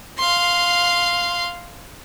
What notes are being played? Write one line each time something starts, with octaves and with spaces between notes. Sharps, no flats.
F5 C6